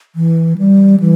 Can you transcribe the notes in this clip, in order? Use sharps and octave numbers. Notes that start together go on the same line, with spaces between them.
E3
G3
E3